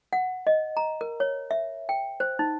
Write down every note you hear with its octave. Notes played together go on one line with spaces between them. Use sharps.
F#5
D#5
A#5
A#4
C#5
E5
G5
C5
D#4